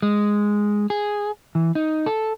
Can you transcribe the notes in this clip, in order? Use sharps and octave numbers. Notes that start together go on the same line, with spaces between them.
G#3
G#4
E3
D#4
A4